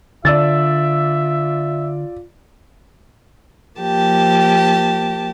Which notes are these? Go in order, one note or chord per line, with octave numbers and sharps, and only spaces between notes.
D3 F4 D5 E5 E6 A6
F3 A#3 G4 A5